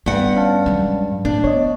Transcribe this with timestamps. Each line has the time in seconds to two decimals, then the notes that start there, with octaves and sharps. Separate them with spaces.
0.06 G2 B3 F#5
0.36 C#4 F5 A5
0.66 F#3 G#3
1.25 A2 A3 D4
1.44 B3 C#5 D#5